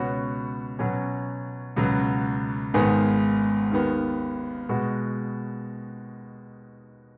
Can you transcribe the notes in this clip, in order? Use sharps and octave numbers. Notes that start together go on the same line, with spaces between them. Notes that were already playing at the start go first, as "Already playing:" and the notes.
Already playing: C#2 B2 B3 F#4 C#5
B2 F#3 C#4
C#2 B2 F#3
G#1 G#2 D#3 B3 G#4
D#2 D#3 B3
B2 G#3 B3 F#4